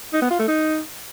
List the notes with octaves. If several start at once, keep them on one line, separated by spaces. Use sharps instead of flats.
D#4
B3
F4
A3
D#4